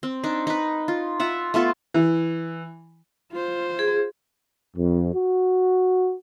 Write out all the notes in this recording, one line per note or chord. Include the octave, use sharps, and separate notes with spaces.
C4
D4 D#4
D#4 B4
F4
F4 E5 F#5
A3 B3 F4 A4
E3
F4 C5
G#4
F2
F#4